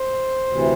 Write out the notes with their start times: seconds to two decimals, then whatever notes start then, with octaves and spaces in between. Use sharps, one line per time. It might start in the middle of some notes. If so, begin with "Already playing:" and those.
Already playing: C5
0.47 D2 C3 E3